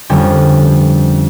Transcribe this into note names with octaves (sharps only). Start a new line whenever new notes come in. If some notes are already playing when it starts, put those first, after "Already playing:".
F2 D3 G3 C#4